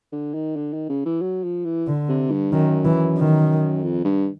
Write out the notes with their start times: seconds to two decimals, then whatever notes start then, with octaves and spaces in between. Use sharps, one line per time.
0.12 D3
0.34 D#3
0.56 D3
0.73 D#3
0.89 C#3
1.06 E3
1.21 F#3
1.44 F3
1.65 E3
1.87 D3
2.08 C3
2.31 G2
2.52 F#2 D#3
2.85 E3
3.18 D#3
3.83 F2
4.04 G2